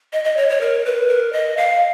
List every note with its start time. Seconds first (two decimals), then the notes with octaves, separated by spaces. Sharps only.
0.13 D#5
0.25 D#5
0.37 C#5
0.50 C#5
0.61 A#4
0.85 B4
1.09 A#4
1.33 D#5
1.57 F5